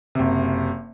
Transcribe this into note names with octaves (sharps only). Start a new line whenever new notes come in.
F#1 C3